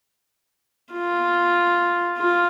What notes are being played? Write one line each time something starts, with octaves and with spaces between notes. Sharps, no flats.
F4
F4